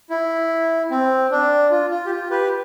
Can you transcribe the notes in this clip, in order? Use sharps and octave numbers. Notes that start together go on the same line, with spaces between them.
E4
C4
D4
F4
F4
G4
F4
G4 B4